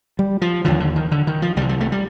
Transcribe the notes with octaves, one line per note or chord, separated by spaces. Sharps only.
G3
F3
D#2 D3 F3
D3
D#3
D3
D#3
F3
C2 C3 G3
G3
A3
G3